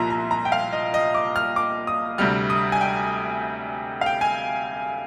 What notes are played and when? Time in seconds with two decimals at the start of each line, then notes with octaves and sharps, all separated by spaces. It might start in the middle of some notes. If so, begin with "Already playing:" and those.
Already playing: C2 A#2 F3 A#5 C6
0.10 A#5
0.31 A#5
0.45 G5
0.52 F5
0.73 D#5
0.94 D#5
1.15 D6
1.36 F6
1.56 D6
1.87 D#6
2.18 D2 C3 G3 F6
2.50 D#6
2.72 G#5
2.81 G5
4.01 F5
4.06 G5
4.21 G#5